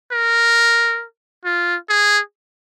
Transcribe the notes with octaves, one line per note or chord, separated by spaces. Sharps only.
A#4
F4
G#4